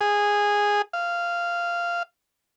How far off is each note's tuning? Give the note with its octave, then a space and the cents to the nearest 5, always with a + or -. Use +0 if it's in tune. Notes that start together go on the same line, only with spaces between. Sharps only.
G#4 -15
F5 -10